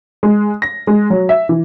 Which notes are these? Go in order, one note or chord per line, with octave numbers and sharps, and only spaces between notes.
G#3
A#6
G#3
F#3
E5
E3